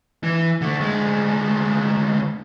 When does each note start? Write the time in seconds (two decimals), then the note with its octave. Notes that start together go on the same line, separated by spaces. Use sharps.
0.24 E3
0.61 D3 A3
0.80 D2 G#3